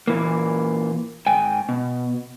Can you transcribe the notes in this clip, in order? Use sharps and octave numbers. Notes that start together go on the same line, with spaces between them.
A#2 E3 A#3
G#2 G5 G#5
B2